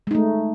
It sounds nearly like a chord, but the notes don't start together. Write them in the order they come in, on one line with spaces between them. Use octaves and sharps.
G#3 D#4 A3